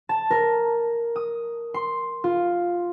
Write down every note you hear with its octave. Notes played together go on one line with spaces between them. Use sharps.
A5
A#4
D#6
C6
F4